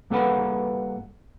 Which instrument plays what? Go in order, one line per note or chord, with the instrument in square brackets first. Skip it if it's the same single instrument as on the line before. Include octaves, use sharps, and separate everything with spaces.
[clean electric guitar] G2 A#3 A4 B4 F#5 B5